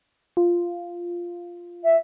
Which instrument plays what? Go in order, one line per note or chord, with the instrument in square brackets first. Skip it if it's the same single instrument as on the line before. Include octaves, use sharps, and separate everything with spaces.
[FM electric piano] F4
[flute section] E5